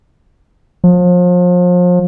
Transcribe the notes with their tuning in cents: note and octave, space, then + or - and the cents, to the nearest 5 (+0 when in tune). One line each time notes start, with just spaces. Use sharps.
F3 +35